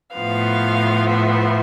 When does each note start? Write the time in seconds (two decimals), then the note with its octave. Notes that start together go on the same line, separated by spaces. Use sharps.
0.15 A2 F3 B3 F5
1.10 E5